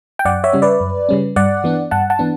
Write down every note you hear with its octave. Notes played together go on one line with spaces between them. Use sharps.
G5
F#2 D5 F#5
C#5 E5
C#3 G3 C#4
B4 D5
F#2
C#3 G3 C#4
G2 D5 F#5
E3 B3 D4
G2 F#5 A5
F#5 A5
E3 B3 D4